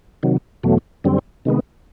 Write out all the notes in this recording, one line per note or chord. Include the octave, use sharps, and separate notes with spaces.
C3 D#3 F#3
E2 B2 F#3 A3
F#2 D3 G3 C4
C3 D#3 G#3 B3